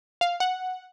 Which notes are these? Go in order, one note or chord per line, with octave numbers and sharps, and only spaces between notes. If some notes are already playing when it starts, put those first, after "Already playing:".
F5
F#5